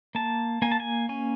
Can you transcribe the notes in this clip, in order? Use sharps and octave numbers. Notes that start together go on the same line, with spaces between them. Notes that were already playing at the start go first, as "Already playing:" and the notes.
A#3 A5
A#3 G#5
A5
G#5
C#4 G#5